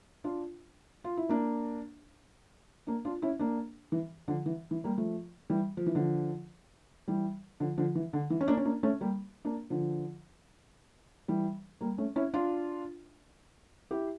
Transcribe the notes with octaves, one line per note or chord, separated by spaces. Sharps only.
D4 F4
F4
E4
A#3 D4
A#3 D4
D4 F4
C#4 E4
A#3 D4
E3
D3 F3
E3
E3
G3 A#3
F3 A3
E3 G3
F3
E3
D3 F3
E3 G3
D3 F3
D3 F3
E3
D3
E3
C#4
A#3 D4
C#4
A#3 D4
A3 C#4
G3 A#3
A#3 D4
D3 F3
E3 G3
G3 A#3
A3 C#4
C#4 E4
D4 F4
E4 G4